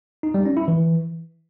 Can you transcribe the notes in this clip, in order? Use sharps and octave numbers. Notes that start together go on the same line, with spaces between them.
D#4
G3
C#4
E4
E3